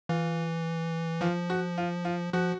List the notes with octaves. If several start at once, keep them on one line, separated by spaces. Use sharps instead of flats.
E3 F4
F3 F4
F#4
F4
F4
F3 F#4